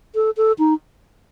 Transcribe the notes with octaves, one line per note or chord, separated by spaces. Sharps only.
A4
A4
D#4